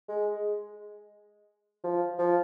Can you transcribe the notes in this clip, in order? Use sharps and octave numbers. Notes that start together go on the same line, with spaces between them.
G#3
F3
F3